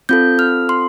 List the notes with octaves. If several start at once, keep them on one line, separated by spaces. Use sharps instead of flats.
C4 F4 A4 G6
F6
C6